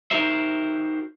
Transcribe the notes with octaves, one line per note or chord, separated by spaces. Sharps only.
D#4 F#4 G4 A#4 C5 E5